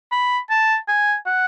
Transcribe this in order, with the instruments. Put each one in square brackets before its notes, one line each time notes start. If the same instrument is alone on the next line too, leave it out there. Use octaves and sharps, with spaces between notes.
[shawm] B5
A5
G#5
F#5